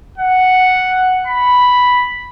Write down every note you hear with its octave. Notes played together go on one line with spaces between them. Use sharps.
F#5
B5